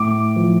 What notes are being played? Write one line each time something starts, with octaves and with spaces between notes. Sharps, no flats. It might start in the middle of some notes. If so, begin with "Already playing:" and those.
Already playing: A2 D6
F3